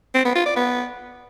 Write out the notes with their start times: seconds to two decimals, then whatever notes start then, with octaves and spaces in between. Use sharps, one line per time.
0.15 C4
0.25 B3
0.35 F4
0.46 D5
0.56 B3